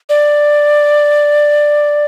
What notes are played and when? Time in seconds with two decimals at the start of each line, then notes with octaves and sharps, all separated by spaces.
0.09 D5